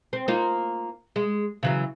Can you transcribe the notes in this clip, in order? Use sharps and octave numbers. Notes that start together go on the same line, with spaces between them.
C4
A#3 D#4 F4
G#3
C#3 E3 F#3